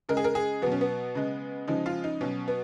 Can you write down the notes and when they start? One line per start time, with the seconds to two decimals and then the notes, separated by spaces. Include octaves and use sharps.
0.09 C#3 G#3 A#4
0.17 G#4
0.24 A#4
0.35 G#4
0.62 B2 F#3 B3
0.72 C#4
0.81 B3
1.15 C#3 G#3
1.68 C#3 F3 G#3 D#4
1.86 F4
2.04 D#4
2.21 B2 F#3 C#4
2.48 B3